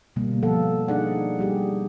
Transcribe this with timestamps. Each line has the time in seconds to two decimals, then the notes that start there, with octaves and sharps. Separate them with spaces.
0.16 B2 D3 G3 A#3
0.43 F3 B3 A4 F5 F#5
0.88 D4 D#4 G#4 D5 F#5
1.39 G3 G4 G#4